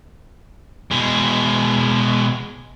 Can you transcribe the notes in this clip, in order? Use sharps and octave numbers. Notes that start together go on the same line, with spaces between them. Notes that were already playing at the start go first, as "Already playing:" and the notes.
B2 G#3